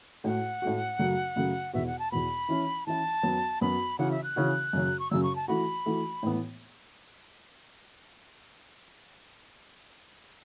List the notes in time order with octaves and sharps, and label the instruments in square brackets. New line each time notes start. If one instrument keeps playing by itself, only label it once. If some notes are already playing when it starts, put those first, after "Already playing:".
[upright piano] A2 A3 F#4 [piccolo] F#5
[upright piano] A2 A3 F#4
F#2 C#3 F#3 A3
F#2 C#3 F#3 A3
[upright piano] E2 B2 B3 F#4 [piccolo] E5
[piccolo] F#5
A5
[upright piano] E2 B2 B3 F#4 [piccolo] B5
[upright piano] E3 C#4 E4
[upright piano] E3 C#4 E4 [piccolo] A5
[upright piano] F#2 F#3 B3
[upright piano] F#2 F#3 B3 [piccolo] B5
[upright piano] C#3 E3 C#4 F#4 [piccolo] F#5
[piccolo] E5
F#6
[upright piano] C#3 E3 C#4 F#4
F#2 C#3 F#3
[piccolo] C#6
[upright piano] F#2 C#3 F#3 [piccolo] E6
[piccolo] C#6
A5
[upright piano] E3 A3 F#4 [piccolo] B5
[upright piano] E3 A3 F#4
A2 E3 B3